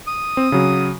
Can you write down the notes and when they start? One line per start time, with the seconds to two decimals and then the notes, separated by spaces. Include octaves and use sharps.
0.08 D#6
0.37 C4
0.52 C#3 F#3